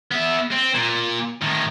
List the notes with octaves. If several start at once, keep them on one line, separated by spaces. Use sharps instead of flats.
B3 E5
C4
A#2
A2 D#3